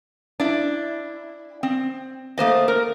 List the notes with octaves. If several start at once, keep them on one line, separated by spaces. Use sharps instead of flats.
D4 E4
C4
A3 A#3 C5 D#5
A#4